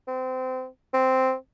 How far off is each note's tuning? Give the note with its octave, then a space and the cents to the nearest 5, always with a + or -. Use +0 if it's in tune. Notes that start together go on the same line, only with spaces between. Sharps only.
C4 -25
C4 -5